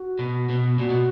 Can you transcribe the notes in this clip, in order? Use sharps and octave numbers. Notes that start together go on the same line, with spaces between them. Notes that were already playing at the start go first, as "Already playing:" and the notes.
Already playing: F#4
B2
B2
A#2 F#4
B2